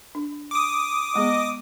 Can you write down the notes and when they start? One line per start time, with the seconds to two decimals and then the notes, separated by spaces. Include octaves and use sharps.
0.15 D4
0.51 D6 D#6
1.15 G#3 B3 G#4 D#5